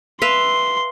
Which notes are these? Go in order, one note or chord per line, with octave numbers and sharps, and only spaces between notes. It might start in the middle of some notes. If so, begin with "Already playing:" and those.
B4 E5 F5 C6